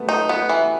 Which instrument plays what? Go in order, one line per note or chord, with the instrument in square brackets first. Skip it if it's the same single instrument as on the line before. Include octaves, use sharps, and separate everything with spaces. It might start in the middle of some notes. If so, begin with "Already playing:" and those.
Already playing: [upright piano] F#3 G3 A3 B3
[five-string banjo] D#4 [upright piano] A4
[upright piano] B4
[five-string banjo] B3
[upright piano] B4
[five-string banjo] E3